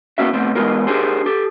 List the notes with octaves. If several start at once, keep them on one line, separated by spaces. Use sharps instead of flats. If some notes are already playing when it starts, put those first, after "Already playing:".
A#3 B3 C#4 F#4 E5
C3 A3 B3 C4
E3 G#3 B3 F4 A#4
D4 G4 G#4 A#4 C5
G4 A4